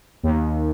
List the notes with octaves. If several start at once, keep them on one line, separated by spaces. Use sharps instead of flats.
D#2